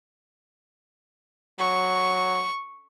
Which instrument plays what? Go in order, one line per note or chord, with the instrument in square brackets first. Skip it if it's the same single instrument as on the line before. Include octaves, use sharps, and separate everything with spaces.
[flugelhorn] F#3 [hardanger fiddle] C#6